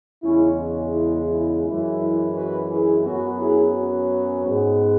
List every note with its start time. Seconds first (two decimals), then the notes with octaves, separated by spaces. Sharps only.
0.22 E2 C#3 G#3 C#4 E4
0.58 C#4
0.93 E4
1.28 E4
1.64 F#2 E3 G#3 E4
1.99 E4
2.34 F#4 B4
2.69 E4 G#4
3.04 F#2 F#3 B3 C#4 F#4
3.39 E4 G#4
3.74 C#4 F#4
4.45 G#2 G#3 B3